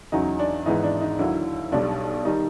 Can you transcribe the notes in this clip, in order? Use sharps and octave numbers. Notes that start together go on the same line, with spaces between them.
E2 C#3 F#3 D#4
D4
G#1 G#2 E3 G#3 B3 D#4
D4
D#4
D#2 D3 F#3 E4
B1 B2 G3 D4
D#3 G3 D#4